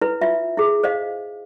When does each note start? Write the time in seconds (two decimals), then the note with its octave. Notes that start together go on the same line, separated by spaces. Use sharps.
0.01 E4 B4
0.21 F4 E5
0.58 E4 G#4
0.84 C5 D#5 F5